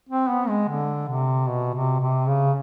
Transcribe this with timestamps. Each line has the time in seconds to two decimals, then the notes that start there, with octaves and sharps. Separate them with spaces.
0.09 C4
0.29 B3
0.48 G#3
0.68 D3
1.09 C3
1.48 B2
1.75 C3
2.01 C3
2.28 C#3